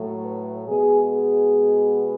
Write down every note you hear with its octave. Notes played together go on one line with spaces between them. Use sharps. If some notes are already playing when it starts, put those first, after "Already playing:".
Already playing: A2 F#3 A3
B4
B2 G#3 B3 G#4
G#4